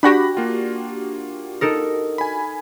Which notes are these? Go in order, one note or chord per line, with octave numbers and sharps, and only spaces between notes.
D4 F#4 G4 B5 F#6 A#6
A#3 F4
D#4 A4 A#4
G#5 B5